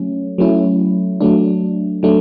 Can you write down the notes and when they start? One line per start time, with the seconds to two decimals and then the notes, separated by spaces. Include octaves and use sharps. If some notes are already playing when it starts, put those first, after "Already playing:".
Already playing: F#3 A3 C#4
0.38 F#3 A3 C#4 E4
1.21 F#3 A3 D4
2.03 F#3 A3 D4